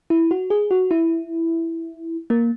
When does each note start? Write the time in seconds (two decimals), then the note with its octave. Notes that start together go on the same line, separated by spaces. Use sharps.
0.10 E4
0.31 F#4
0.50 G#4
0.71 F#4
0.91 E4
2.30 A#3